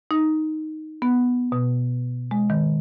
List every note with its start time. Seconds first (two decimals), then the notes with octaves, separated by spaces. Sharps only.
0.11 D#4
1.02 B3
1.52 B2
2.31 G#3
2.50 D#3